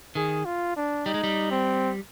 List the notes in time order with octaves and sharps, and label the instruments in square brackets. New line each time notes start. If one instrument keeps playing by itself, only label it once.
[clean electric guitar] D#3 [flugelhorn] G#4
[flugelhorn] F4
D4
[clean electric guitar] G3 [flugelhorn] D#4
[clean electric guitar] G#3
G3
[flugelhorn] C4